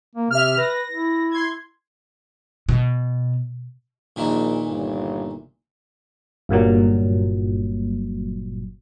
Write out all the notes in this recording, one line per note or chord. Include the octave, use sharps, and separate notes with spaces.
A#3
C3 E5 F6
B4 A#6
E4
C6 G#6
B2
A#1 A#2 D#3 E3
G1
G1 G2 A#2 F#3